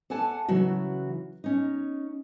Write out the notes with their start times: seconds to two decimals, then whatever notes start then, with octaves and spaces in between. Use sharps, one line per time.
0.10 A4 D5 F#5 G#5 A5
0.48 C#3 E3 F#3 F#4
1.44 C#4 D#4